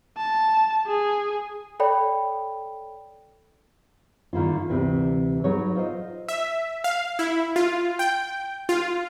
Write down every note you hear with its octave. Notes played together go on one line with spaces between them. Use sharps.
A5
G#4
A4 C#5 D5 G5 B5
D3 D#3 A#3 E4 F4
D2 C3 E3
F#3 D#4 A4 B4 C#5
F4 C5 D#5
E5
F5
E4
F4
G5
F4